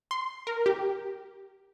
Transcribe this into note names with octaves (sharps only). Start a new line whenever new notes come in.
C6
A#4
G4